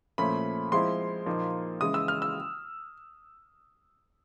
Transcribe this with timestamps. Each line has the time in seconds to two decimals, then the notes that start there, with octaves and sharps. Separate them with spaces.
0.18 A#2 F3 A3 C#4 B5
0.72 F3 G#3 C4 E4 C6
1.26 A#2 F3 A#3 D#4
1.81 C#3 E3 G#3 D#6
1.94 E6
2.08 F6
2.22 E6